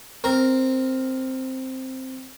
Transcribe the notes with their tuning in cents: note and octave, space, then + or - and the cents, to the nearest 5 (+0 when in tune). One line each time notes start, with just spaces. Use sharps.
C4 +0 A#4 +0